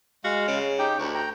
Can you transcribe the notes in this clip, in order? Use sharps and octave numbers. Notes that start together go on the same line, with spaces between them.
G#3 F#4 F5
C#3
D#4 G4 G5
D2 C#6
G5 A#5